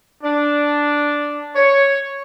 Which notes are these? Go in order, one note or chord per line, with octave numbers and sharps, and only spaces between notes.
D4
C#5